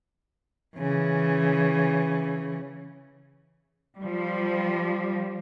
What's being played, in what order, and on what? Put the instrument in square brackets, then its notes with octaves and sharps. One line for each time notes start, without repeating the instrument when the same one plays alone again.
[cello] C#3 E3
[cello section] F3 G3